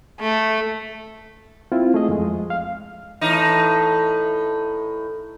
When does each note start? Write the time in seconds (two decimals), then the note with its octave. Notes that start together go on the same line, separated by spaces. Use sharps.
0.19 A3
1.72 C4 E4 F4
1.94 A3 G#4 D#5
2.09 F2 F3 G#3
2.50 F5
3.21 A2 E3 D#4